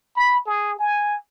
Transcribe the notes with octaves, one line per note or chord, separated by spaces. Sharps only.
B5
G#4
G#5